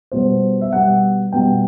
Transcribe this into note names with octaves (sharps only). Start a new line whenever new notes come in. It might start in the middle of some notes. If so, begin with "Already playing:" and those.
B2 G3 B3 C5
E5
B2 G3 B3 F#5
B2 G3 B3 G5